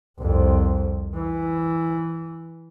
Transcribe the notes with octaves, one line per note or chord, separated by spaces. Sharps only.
C2 F2
E3